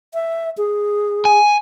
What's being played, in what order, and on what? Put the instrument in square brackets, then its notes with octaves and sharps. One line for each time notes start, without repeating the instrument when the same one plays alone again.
[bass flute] E5
G#4
[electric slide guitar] G#5